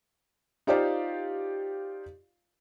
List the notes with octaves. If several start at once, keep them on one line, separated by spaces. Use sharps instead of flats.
D#4 F4 G4 C5 D5 F5